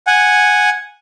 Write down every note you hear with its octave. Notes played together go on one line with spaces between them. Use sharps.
F#5 G#5